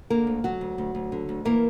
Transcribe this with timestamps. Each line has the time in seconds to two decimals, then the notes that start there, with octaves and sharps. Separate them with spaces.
0.10 D3 A#3 A#4
0.27 D2
0.44 D2 F#3 F#4
0.61 D2
0.78 D2
0.95 D2
1.12 D3
1.29 D2
1.45 E3 A#3 A#4